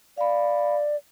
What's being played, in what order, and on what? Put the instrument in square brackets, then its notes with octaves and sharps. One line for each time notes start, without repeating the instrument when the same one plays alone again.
[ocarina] D5 [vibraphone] F5 B5